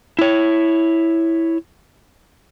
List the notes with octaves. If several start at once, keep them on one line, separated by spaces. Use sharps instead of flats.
E4 C#5